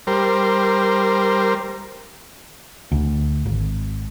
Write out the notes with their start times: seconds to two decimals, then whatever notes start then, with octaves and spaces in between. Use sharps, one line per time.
0.07 G3 A#4 C5
2.92 D2
3.45 G#1